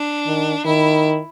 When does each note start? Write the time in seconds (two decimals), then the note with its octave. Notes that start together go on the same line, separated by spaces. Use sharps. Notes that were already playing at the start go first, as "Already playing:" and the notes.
Already playing: D4
0.27 D#3
0.65 D#3 E4